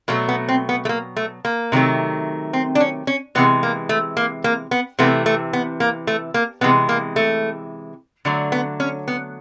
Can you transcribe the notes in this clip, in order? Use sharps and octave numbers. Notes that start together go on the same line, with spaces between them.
B2 F#3 A3 A#3
B3
C4
B3
A3
A#3
A3
A#3
C3 D#3 F#3 A3
C4
D4
C#4
C#4
C3 E3 G#3 B3
A#3
A3
A#3
A#3
B3
C3 E3 A3 B3
A3
B3
A#3
A3
A#3
C3 E3 G#3 B3
A#3
A3
D3 F#3 A3
B3
C#4
B3